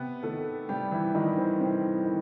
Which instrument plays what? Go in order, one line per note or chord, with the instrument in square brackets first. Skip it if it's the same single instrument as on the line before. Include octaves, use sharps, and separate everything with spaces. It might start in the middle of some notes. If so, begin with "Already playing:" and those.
Already playing: [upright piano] C3 B3 B4
D#3 A3 A4
C3 G3 G4
E3 E4
D#3 G3 D#4
C4
C3 C4
D#3